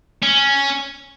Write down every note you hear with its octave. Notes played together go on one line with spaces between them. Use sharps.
C#4